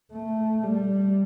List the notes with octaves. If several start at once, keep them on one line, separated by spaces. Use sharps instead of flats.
A3
G3